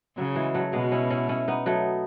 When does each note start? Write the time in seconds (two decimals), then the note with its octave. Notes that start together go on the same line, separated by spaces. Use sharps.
0.17 C#3 F#3
0.35 E3 G#3
0.55 F#3 A3
0.73 B2 G#3 B3
0.92 C#4 E4
1.10 C#4 E4
1.29 C#4 E4
1.48 B3 D#4
1.66 F#3 A3